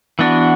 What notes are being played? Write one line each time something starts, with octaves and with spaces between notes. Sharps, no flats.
E3 B3 D4 F#4